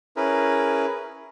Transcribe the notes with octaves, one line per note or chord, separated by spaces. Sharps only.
C#4 E4 G#4 A#4 B4